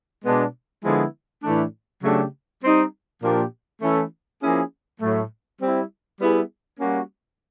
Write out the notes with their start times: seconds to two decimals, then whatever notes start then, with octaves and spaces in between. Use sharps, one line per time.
0.24 B2 G#3 B3 D4
0.84 D3 F3 G#3 B3 E4
1.43 A2 E3 A3 D4
2.03 C#3 F#3 A3 D4 G4
2.62 G3 C4 D#4
3.22 A#2 F3 A#3 D4 G4
3.82 E3 A3 C#4 E4 A4
4.41 F3 A#3 C#4 E4 G#4
5.01 A2 F#3 A3
5.60 G3 C4 E4
6.20 G3 B3 E4 G#4
6.80 G3 A#3 C#4 F#4